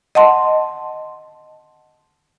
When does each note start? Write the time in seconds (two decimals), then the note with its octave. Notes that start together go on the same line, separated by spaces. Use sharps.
0.15 D#5 F#5 A5 C6